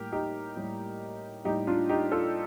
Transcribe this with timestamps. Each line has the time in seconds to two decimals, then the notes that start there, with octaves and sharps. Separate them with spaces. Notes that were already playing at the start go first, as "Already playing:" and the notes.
Already playing: A2 G3 A#3 G4 A#4
0.12 D#4 G4
0.56 A2 G3 A#3
1.45 A2 G3 A#3 D#4 G4
1.67 D4 F4
1.89 D#4 G4
2.12 F4 A4